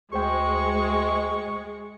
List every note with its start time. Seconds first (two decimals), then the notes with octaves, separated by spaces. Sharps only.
0.13 D2 G#3 G#4 C5 G5 C#6